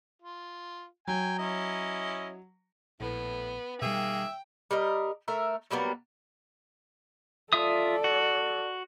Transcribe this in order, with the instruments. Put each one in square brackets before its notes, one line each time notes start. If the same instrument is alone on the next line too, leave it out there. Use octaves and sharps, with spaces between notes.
[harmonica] F4
[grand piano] F#3 [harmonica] G5 G#5
[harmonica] C#4 E4 D#5
[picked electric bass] A#1 [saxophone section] A2 [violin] B3
[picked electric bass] B2 G3 [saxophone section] D#3 A#3 G#4 [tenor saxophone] E5 [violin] G5
[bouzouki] G3 A#4 D#5
A3 A#4 E5
F#3 G3 A#3 B3
[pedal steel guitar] F4 E5 D#6 [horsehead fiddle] A4 D5
[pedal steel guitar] F#4